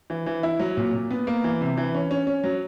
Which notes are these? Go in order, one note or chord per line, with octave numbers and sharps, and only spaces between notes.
E3
E3
E4
F#3
A#2
A#2
B3
A#3
E3
C3
E3
C#4
C#4
C#4
F#3